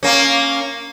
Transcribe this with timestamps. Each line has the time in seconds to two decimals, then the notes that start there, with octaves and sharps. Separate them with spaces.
0.03 A#3 C#4